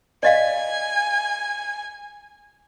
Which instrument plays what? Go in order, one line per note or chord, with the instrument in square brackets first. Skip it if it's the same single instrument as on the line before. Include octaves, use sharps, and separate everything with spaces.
[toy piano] D5 D#5 F5 [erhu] G#5